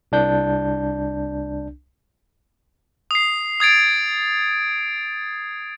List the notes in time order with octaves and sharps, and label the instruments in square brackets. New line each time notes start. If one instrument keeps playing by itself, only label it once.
[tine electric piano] C2 D4 G6
[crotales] D#6 C7
D#6 G#6 A6 D7